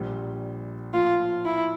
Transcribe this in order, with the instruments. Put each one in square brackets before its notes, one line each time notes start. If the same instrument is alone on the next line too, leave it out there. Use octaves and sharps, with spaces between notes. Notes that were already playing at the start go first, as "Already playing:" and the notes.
Already playing: [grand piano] A#1 A#2 G3
[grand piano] A2 F3 A#3 [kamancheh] F4
[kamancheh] E4